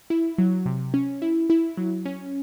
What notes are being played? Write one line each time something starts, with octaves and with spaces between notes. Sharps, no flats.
E4
F#3
C3
C#4
E4
E4
F#3
C#4